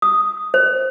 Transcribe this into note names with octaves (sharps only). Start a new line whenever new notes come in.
D#6
C5